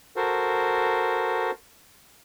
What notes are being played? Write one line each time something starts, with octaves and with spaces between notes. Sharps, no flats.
F#4 A4 A#4 C5